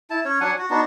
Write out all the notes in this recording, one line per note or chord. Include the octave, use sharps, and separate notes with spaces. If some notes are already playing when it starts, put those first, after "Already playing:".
E4 A5
C#4 C#5
F#3 D4 F#5 G#5
F#4
B3 D4 D#4 F#4